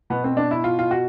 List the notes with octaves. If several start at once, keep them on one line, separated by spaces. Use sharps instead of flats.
B2 B3
C4
D4
E4
F4
F4
F#4